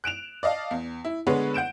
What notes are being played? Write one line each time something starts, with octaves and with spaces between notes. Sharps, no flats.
F#6 D7 E7 F7
D5 D#5 F5 A5
E2
E4
D3 G#3 B3 B4 C#5
F#5 G6 D7 E7